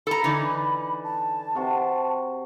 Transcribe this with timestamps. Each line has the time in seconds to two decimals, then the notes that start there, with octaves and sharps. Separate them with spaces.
0.07 A4 A#5 B5
0.24 D3 E3 D#4
1.03 A5
1.55 C3 F#4